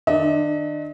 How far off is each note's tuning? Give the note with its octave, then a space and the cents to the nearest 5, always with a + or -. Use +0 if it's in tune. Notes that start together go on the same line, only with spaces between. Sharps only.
D#3 -25 D4 +30 D#5 +40